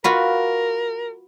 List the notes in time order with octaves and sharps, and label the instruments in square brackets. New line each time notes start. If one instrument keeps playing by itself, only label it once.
[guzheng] F4 F#4 B4 [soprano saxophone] A#4